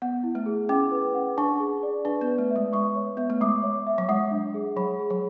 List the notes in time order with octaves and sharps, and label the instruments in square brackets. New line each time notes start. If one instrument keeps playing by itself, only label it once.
[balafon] B3 [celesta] F#5
[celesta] E4
[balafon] A3
[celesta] G#4
[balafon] C#4 [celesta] D6
[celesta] B4
F#5
[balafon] D4 [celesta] C#6
[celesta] G#4
D5
[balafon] D4 [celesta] B4
[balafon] B3
[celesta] B4
[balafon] A3
[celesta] E5
[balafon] G#3
[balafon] G#3 [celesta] C#6
[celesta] C#5
[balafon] B3 [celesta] E5
[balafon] A3
[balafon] G#3 [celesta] D6
[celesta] C#5
E5
[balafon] F#3
[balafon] G#3 [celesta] F#5
[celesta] D4
G#4
[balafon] F#3 [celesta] B5
[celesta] G#4
[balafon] F#3